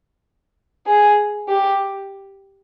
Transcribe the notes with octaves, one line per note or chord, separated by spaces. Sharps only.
G#4
G4